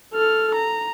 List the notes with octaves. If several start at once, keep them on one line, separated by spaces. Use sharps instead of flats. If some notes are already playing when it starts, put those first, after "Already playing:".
A4 F6
A#5